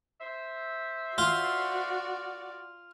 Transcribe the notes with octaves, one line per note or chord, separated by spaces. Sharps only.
C5 E5
F4 F#4 D5